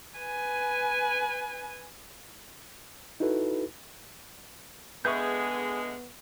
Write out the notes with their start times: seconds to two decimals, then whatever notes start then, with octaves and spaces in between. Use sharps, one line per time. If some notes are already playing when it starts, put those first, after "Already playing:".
0.18 B4 G#5
3.20 D#4 E4 F#4 A4 B4
5.05 D3 G#3 B3 G#4 B4 E5 C#6 G6